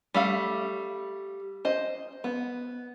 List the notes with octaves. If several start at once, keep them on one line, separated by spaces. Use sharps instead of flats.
G3 A3 F5
C5 D#5
B3